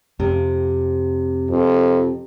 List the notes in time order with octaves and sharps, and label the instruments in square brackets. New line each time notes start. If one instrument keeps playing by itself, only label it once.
[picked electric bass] F2 [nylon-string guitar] C3
[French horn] F2